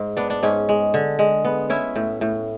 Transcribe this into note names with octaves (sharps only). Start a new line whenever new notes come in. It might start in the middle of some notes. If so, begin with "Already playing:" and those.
Already playing: G#2
B3 D4
D4
G#2 C#4
G#3
D3
G#3
B3
C#4 E4
A2
A2